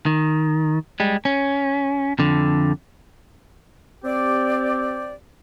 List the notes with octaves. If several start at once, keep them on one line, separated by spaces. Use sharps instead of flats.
D#3
G3 G#3
C#4
F2 D3
C4 G4 D5